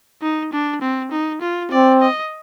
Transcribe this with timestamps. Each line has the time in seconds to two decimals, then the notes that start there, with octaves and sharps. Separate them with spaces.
0.22 D#4
0.53 D4
0.81 C4
1.11 D#4
1.41 F4
1.71 C4 D5
2.01 D#5